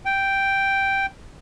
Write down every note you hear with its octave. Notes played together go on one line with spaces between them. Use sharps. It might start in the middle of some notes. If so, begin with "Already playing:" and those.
G5